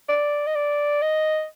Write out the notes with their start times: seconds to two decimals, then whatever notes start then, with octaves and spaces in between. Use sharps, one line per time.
0.09 D5
0.47 D#5
0.55 D5
1.02 D#5